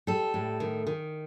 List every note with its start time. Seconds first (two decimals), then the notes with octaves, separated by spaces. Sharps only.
0.07 G3 A4
0.34 A2
0.60 D#3
0.87 D#3